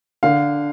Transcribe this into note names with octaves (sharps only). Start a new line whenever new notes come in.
D3 F5